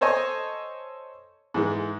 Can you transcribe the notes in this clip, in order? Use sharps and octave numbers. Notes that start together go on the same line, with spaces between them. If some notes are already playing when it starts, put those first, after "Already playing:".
A4 C5 C#5 D#5 G#5
G#2 E3 G#3